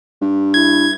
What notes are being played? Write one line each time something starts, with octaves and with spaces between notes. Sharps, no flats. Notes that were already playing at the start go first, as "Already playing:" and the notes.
G2
E4 G#6